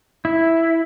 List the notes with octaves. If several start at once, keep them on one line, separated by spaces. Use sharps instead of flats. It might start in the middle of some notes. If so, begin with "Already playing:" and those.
E4